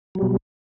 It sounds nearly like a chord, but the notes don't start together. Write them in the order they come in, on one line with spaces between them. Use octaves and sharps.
F#3 G3 B2